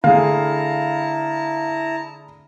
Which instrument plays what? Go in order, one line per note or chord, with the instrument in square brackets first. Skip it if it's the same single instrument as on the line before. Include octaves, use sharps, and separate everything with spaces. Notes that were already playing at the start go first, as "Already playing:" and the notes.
[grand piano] D3 A3 G#4 [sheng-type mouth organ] E4 A5 A#5 [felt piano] F5